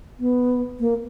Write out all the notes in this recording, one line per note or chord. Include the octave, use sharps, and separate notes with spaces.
B3
A#3